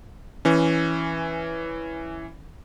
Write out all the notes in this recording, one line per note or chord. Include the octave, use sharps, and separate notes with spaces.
E3 C#4